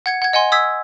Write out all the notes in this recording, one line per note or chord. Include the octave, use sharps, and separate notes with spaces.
F#5 G#6 C#7
F#5 G#6
D#5 F#5 G#5 C6
D#6 E6 G#6 B6